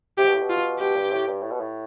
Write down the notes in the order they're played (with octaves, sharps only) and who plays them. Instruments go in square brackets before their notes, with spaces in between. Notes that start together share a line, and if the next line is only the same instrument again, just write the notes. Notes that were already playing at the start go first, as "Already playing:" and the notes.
[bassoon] C3 [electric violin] G4
[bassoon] B2
A2
B2
[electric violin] F4
[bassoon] B2 [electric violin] G4
[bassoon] G2
A2
G2
A2
B2
A2